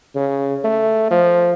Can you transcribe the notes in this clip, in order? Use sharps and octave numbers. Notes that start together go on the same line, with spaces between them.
C#3
A3
F3